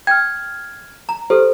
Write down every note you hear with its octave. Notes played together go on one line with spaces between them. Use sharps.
G5 F6 G#6
A#5
G4 A4 C5